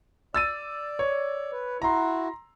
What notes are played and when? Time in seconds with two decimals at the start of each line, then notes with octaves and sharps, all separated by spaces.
0.34 D5 E6 A6 D#7
0.99 C#5
1.52 B4
1.82 E4 F#4 A#5 C6